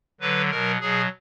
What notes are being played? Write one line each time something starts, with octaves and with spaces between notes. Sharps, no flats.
D3 F#3 B4
B2 F#3 A#4
B2 F#3 G#4